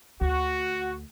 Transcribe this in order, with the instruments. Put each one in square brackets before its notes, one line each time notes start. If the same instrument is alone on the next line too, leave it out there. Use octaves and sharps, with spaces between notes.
[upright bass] D2 [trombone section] F#4